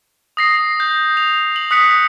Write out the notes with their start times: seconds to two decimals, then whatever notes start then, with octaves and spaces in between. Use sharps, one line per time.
0.37 D#6 A#6 C7
0.80 G6
1.17 F7
1.56 F#7
1.71 D#6 F#6 B6 C#7